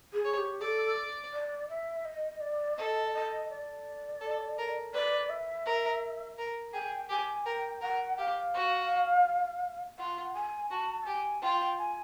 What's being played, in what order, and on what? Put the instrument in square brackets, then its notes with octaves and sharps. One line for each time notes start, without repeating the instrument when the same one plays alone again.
[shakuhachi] G#4
[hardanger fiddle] C#5
[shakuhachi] G4
[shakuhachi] A4 [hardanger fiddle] D5
[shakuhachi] D5
E5
D#5
D5
[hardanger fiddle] A4 [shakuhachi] D#5
[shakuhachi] D#5
D5
[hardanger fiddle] A4
A#4
[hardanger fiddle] B4 [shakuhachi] D5
[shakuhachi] E5
[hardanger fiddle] A#4
A#4
[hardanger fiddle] G#4 [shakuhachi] G5
[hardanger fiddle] G4 [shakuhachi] G#5
[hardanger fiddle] A#4 [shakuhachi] G5
[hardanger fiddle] A#4 [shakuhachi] F#5
[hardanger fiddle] G4 [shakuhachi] F5
[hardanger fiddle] F#4
[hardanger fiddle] F4 [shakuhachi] F#5
[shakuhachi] G#5
[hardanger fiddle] F#4 [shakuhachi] A5
[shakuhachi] A5
[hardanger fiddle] G4 [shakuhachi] G#5
[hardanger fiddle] F4 [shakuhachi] G5
[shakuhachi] G#5